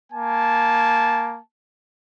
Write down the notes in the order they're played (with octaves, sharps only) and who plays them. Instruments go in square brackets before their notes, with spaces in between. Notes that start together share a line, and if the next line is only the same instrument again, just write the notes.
[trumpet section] A#3 G#5 A5